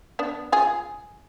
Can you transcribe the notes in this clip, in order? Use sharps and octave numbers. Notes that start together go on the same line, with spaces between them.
B3 D4
F4 G#4